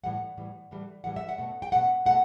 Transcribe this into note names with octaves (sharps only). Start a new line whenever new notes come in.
A2 E3 G3 F#5
A2 E3 G3
A2 E3 G3
A2 E3 G3 F#5
E5
F#5
B2 A3
G5
B2 A3 F#5
B2 A3 F#5